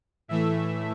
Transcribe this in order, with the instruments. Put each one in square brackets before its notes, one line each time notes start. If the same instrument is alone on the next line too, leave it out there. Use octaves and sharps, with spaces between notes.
[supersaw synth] A2 E3 A3 E5